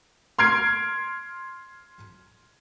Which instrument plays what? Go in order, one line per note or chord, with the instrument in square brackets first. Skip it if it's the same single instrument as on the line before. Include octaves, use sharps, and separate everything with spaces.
[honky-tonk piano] C6 F6 G#6 C7 D7